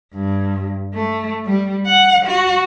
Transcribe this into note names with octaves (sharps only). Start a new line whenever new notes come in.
G2
A3
G3
F#5
F#4